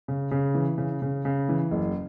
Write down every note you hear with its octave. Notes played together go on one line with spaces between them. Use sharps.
C#3
C#3
E3
C#3
C#3
C#3
E3
F#1